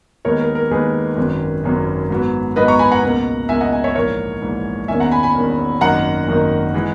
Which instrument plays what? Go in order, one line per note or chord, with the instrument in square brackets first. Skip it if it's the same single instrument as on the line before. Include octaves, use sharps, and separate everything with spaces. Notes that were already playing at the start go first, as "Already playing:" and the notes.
[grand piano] D#2 D#3 G#3 B3 D#4 A#4 C#5
A#4
A#4
D#2 D#3 G#3 B3 D#4 G#4 B4
G#1 F#2 D#3 F#3
G#1 F#2 D#3 F#3
G#2 F#3 B3
G#2 F#3 B3 B4 D#5
A#5 C#6
G#5 B5
F#5 A#5
C#2 B2 A#3
C#2 B2 A#3 E5 G#5
D#5 F#5
E5 G#5
C#5 E5
A#1 G#2 E3 A#4 C#5
A#1 G#2 E3
E1 E2 D#3 A#3 C#4 E5 G#5
F#5 A#5
G#5 B5
G#5 B5
E1 E2 D#3 A#3 C#4
G#1 F#2 D#3 A#3 D#4 F#5 A#5
G#1 F#2 D#3 A#3 D#4
E3 G#3